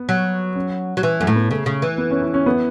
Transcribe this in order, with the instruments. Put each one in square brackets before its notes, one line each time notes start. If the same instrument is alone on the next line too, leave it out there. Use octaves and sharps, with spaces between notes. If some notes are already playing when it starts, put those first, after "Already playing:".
Already playing: [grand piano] B3
[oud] F#3
[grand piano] C#4
[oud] F#3
E3
[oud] F#2 [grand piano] A3
[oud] A2
[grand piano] B3
[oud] C#3 [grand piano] A3
[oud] C#3
E3
[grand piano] B3
C#4
E4
C#4
B3